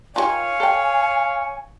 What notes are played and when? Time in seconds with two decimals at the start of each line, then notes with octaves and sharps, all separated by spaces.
0.16 D#3 E4 F4 C#5 F5 G#5
0.60 A4 G5